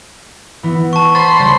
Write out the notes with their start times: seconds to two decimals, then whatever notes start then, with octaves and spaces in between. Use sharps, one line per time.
0.63 E3 B3 E4
0.93 A5 C#6
1.15 C5 B5 C6 A6
1.39 C#3 G3 B3